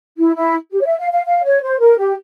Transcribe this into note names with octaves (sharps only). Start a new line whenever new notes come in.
E4
E4
G4
C#5
E5
F5
F5
F5
C#5
C5
A#4
G4